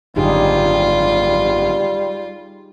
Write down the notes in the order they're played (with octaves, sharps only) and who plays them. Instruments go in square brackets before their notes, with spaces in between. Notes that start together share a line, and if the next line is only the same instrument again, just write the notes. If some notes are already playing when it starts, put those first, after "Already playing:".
[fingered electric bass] G#1 F#2 D3 [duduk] G3 [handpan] D#4 G4 G#4 [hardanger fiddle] F4